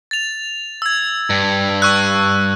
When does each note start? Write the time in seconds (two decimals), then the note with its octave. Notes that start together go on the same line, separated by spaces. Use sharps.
0.11 A6 F7
0.82 E6 G#6
1.30 G2
1.82 C#6 E6 F#6